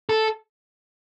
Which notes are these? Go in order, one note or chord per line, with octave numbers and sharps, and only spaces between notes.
A4